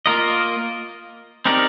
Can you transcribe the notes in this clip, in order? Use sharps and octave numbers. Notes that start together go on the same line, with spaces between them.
A#3 F4 A#4 D#5
C4 D#4 G4 A#4 D5